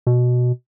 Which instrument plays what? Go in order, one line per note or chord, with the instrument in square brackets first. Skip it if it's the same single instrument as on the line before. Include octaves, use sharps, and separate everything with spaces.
[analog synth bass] B2